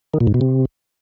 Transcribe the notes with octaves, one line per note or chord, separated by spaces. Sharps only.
D#3
A#2
G#2
B2
C3